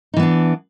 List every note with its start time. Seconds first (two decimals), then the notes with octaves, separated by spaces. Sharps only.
0.14 D#4
0.17 E3
0.20 B3
0.23 D4